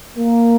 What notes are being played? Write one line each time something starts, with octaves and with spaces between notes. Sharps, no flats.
A#3